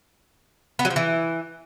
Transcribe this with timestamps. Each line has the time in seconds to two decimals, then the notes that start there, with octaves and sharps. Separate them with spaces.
0.79 B3
0.85 F#3
0.90 F3
0.96 E3